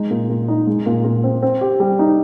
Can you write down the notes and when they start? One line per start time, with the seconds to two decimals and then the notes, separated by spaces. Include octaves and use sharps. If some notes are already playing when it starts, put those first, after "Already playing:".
Already playing: G#3 D#4
0.11 A#2
0.29 A#2
0.48 D#4
0.67 G#3
0.86 A#2
1.04 A#2
1.24 C4
1.43 C4
1.61 G4
1.80 G3
1.99 D#4